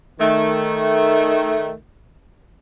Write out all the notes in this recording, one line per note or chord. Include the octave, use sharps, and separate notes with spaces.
D#3 A3